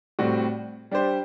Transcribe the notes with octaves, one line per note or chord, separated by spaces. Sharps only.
A2 G3 C4 F#4
G3 D4 G4 C5